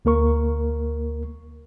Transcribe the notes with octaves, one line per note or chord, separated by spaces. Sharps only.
D2 A#3 A#4 C#6